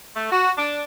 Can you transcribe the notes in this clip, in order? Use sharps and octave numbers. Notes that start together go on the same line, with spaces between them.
A3
F#4
D4